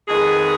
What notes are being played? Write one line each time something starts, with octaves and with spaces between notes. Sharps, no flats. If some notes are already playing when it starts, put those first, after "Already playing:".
F2 D#3 G#3 B3 G#4